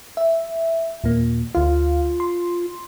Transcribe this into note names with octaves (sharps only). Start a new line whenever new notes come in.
E5
D#2 A#2 A#3
D2 F4 F5
C6